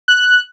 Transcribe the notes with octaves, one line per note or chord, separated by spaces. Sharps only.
F#6